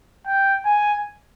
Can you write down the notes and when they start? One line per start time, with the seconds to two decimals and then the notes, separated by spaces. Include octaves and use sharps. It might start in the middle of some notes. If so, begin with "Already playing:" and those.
0.26 G5
0.65 G#5